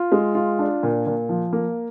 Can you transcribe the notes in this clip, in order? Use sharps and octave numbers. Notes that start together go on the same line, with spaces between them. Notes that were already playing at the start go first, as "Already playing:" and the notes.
Already playing: F4
G#3
F4
D4
A#2
A#2
F3
A#3